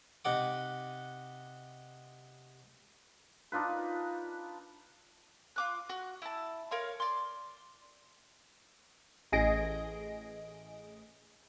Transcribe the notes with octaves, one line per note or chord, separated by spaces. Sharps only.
C3 D#4 F#5 D6
D4 D#4 F4 B4
F4 D6 F#6
F#4
E4 A5
A#4 C#5 F5 C6
D5 C6
A1 G#4 D#5 A#6 D7